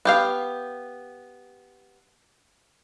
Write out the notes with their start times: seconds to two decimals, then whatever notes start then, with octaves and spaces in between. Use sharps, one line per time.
0.05 B3 G4 F5